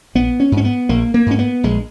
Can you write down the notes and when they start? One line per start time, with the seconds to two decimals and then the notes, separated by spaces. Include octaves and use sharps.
0.15 A#1 B3
0.40 C#4
0.52 G#2
0.57 C#4
0.64 B3
0.89 A#1 A#3
1.14 A#3
1.26 G#2 C#4
1.39 B3
1.63 A#1 G#3